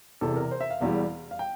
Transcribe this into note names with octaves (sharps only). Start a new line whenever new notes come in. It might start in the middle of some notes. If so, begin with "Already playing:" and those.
E1 E2 C3 E3 A4
A#4
C5
E5
F5
E1 E2 E3 G3
F5
G5